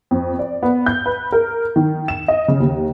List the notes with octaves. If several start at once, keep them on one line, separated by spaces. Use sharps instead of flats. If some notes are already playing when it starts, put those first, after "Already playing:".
F2
D5
B3
G6
B4
A#4
D#3
E7
D#5
C#3
D#2